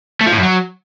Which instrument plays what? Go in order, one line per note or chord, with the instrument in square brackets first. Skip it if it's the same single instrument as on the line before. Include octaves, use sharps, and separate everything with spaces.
[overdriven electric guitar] A3
F3
A2
F#2
F#3